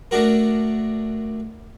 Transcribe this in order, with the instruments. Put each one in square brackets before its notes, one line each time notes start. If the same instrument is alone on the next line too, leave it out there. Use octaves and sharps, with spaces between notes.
[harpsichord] A3 D4 F#4 A#4